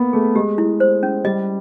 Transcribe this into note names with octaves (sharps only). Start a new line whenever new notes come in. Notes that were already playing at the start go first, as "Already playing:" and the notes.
Already playing: A#3 B3
A3 G#4
G#3 G4
E4
C5
C#4
G3 D#5